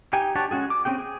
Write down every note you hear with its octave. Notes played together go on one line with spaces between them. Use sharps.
D#4 G4 G5 G#5
D4 F#4 G4 C#5 A5
G#3 C#4 F#4 G#4
D6
C4 C#4 G#4 G5
G#4